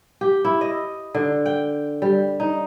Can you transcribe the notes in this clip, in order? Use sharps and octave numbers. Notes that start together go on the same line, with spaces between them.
G4
E4
D#5
D3
G5
G3
D#4